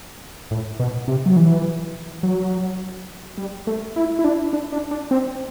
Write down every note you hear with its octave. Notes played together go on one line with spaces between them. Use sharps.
A2
B2
C3
F#3
E3
F#3
G3
A3
E4
E4
D4
D4
D4
D4
C4